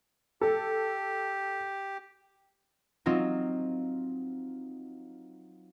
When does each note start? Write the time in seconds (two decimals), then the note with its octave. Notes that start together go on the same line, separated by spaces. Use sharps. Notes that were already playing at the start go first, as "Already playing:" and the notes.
0.41 G4 A4
3.06 F#3 C4 D#4 F4